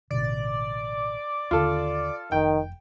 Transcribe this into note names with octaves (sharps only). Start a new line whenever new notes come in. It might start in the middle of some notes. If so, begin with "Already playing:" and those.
A1 B2 D3 D5
D#2 D3 F4 A4
F1 D#3 G5